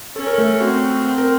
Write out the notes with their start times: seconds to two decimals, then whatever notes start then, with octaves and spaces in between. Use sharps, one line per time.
0.16 C#4 A4
0.27 A#4
0.38 A3 A4
0.60 C4 F#4
1.06 C4
1.18 A#4